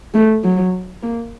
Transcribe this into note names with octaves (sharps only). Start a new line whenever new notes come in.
A3
F#3
A#3